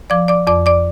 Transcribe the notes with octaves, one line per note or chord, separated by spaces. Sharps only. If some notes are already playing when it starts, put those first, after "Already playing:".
F3 D5 D6
D5 D6
F2 D5 D6
D5 D6